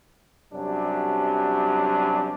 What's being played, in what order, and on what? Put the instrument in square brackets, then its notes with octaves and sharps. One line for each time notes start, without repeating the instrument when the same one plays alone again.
[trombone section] F#2 C3 F#3 G3 D4